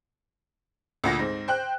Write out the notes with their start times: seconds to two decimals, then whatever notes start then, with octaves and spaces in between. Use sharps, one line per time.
1.04 D2 A#2 F#5 A#6
1.19 G#2 C4
1.48 C5 G5 F#6